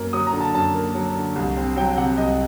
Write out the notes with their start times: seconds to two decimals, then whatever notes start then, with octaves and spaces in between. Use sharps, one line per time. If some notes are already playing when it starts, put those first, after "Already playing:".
Already playing: F#2 A#3
0.13 F#3 D#6
0.27 A#5
0.33 D3
0.40 A5
0.54 F#2 A5
0.75 A#3
0.95 F#3
1.15 D3
1.36 C2
1.57 C4
1.76 F#3 G5
1.97 C3 F#5
2.18 C2 D#5